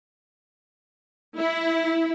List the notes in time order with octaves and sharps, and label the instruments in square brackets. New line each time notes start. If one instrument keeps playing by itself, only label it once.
[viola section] E4